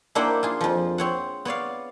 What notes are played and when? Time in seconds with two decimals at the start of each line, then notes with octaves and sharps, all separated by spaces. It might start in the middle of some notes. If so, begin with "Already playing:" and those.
0.15 A#3 D4 E4 C5 F#5 G5
0.43 F4 G#4
0.61 F2 F3
0.98 C4 C#5 F#5
1.45 B3 C#5 D5 F5